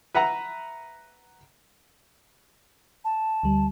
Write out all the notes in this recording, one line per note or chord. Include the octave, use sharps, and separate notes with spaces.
B4 E5 F#5 A#5
A5
D2 G3